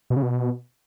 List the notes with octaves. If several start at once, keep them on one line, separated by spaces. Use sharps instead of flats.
B2
C#3
B2